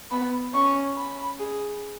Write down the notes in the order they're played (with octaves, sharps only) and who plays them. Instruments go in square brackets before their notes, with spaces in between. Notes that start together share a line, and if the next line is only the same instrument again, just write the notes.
[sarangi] B3 [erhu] B5
[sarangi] C#4 [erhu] C#6
[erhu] B5
[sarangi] G#4